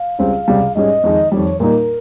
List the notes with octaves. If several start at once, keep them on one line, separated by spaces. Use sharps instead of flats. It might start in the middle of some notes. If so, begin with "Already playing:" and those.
Already playing: F5
C#2 C#3 G3 C4
C#2 C3 G3
G#2 G3 C#4 G#4 D#5
F2 D#3 G#3 D#4
F2 D#3 G3 C#5
A#2 G3 A#3 D#4 A#4